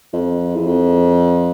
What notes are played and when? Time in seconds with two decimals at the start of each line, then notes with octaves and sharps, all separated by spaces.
0.13 F2
0.56 E2
0.66 F2